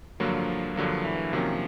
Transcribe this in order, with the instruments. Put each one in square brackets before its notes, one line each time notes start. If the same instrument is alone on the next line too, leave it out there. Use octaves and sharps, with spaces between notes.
[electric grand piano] G2 D3 F#3 A#3 [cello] F3
[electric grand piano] G2 D3 F#3 A#3 [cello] F3
[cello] E3
[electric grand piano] C3 D#3 F#3 A#3 C#4 [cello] F3